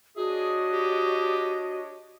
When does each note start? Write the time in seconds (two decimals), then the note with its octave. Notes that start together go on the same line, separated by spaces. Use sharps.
0.17 D4 F#4 G#4 C#5 D#5
0.72 G4